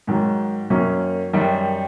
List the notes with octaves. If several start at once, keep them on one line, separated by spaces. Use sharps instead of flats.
G#2 D#3 F#3
F#2 D#3 F#3 A#3 C#4
F#2 D#3 G3